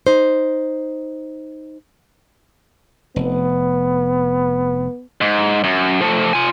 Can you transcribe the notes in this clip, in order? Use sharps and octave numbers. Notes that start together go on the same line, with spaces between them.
D#4 C5
F1 B3
G#2
F#2
F3 A3
F4 G#5